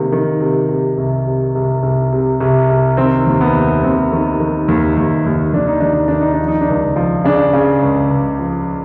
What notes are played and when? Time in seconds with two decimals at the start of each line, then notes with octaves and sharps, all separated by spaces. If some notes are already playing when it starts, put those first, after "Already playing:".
Already playing: C3 D#3 A#3
0.12 D#3
0.40 C3
0.69 C3
0.98 C2
1.26 C3
1.55 C2
1.83 C2
2.12 C3
2.40 C2
2.69 C2
2.97 D#3 C4
3.27 D#2
3.41 B3
3.55 D#2
3.83 D#2 C4
4.12 D#3
4.40 D#3
4.68 D#2
4.97 D#2
5.26 D#2
5.53 D#2 D4
5.67 D#4
5.80 D#2 D4
5.94 D#4
6.08 D#3 D4
6.21 D#4
6.34 D4
6.40 F3
6.48 D#4
6.61 D4
6.68 C#2
6.96 F3
7.24 C#3 D4
7.53 C#3
7.82 C#2
8.10 C#2
8.39 F3